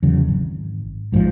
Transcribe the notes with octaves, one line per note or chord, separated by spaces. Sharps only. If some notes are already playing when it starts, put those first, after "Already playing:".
E2 C#3 F#3
G#1
A#1 G#2 E3 F3